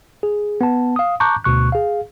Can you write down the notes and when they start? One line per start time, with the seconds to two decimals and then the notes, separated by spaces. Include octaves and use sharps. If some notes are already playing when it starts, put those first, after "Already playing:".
0.23 G#4
0.61 B3 A5
0.96 F5 D#6
1.20 A5 A#5 C#6 D6 F#6 G6
1.44 D2 B2 C#6 F#6
1.72 G#4 F5